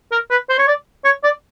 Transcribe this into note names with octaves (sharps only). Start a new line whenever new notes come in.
A#4
B4
C5
C#5
D5
C#5
D5